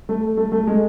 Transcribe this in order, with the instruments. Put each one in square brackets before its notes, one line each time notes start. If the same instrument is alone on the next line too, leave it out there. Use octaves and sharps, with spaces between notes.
[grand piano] A3
A3
A3
G#3